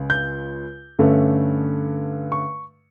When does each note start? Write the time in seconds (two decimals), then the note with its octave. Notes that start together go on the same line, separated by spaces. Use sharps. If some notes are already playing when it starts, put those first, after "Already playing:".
Already playing: C#2 C#3
0.10 G6
0.99 G2 D3 A3 C#4
2.32 C#6